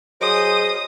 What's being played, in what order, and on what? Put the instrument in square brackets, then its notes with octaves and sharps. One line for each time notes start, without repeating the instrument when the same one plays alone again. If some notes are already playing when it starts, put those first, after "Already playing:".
[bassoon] F#3 [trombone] G#4 [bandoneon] C5 D#5 [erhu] D#6